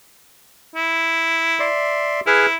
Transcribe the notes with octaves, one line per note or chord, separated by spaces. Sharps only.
E4
D5 E5 C6
E4 G#4 B4 F6